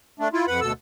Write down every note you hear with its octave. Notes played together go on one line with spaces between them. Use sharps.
A3 D4
E4 F4
F2 B4 F#5 B5
D2 B2 A4 E6